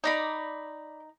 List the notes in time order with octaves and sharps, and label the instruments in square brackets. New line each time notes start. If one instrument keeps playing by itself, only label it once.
[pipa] D#4 [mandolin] D5 A#5 B5